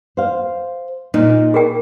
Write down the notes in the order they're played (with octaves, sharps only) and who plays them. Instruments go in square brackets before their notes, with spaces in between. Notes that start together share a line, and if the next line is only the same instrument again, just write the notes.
[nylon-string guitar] C5 F5
[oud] A#2 [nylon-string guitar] D#4
[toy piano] G#4 A#4 G5